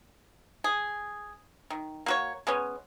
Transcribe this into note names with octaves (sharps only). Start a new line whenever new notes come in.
G#4
D#3
A#3 F#4 C#5
G#3 B3 C#4